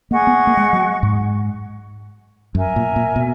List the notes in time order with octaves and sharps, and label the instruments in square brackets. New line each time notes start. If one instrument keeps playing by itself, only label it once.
[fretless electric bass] A#3 [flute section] G#4 D#5 F#5 C#6
[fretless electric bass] B3
A#3
G#3
F#3
G#2
[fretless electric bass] F#2 [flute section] A#4 E5 G#5
[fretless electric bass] A#2
A#2
B2